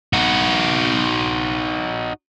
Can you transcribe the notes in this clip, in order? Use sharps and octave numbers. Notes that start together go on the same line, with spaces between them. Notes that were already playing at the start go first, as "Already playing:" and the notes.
D#4 F#4